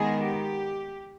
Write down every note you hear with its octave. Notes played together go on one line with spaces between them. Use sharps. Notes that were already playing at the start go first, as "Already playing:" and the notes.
Already playing: D#3 G#3 B3 G#4
G4